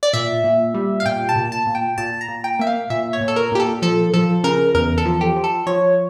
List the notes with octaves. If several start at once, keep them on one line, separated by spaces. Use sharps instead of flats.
D5
A#2 E5
A#2
G3
F5
A#2 G5
A5
A#2
A5
A#2
G5
A#2 A5
A#5
A#2
G5
A#3 E5
F5
A#2 E5
C#5
A#2
A4
A#4
A#2 G4
A4
F3 A4
F3 A4
C#3 A#4
E2 A#4
A4
F3
G4
F3
A4
F3 C#5